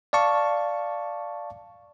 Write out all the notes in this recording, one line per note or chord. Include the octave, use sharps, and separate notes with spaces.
D5 F5 A5 C#6